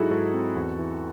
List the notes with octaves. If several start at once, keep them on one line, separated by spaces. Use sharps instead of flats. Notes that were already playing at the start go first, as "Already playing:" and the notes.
Already playing: G#2 F#3 D#4 E4 F#4 G#4 A4
G#2 F#4 A4
C4
E2
E3